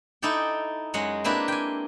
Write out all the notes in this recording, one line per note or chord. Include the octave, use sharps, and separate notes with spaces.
D#4 E4 A4 D5 G5
F#2 F#3 G#3 F#5
A#3 C4 D4 E4 G4 B4
G5 G#5